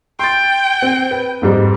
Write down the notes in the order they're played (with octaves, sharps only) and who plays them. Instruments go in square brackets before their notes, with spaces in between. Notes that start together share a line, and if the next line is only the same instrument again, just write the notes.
[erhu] G5 [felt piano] C6 A6
[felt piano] C4
B4
F2 G#2 G3